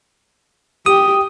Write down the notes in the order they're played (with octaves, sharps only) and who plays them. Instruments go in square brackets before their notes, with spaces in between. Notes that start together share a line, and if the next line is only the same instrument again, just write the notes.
[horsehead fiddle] G4 [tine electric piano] D#6